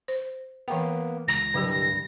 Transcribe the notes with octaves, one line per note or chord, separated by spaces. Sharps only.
C5
E3 A#3 B3 G5
C#2 A#6
C2 G2 D3 F#3 G3 G4